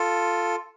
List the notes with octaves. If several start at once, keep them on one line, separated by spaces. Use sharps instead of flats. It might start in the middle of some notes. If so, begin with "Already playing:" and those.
Already playing: F4 A4